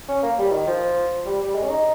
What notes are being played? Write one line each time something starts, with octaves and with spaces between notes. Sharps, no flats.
C#4
A#3
G3
D#3
F3
G3
G3
G#3
C#4
D#4